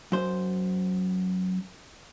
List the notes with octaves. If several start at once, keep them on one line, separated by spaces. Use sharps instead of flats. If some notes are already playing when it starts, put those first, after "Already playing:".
F#2 C5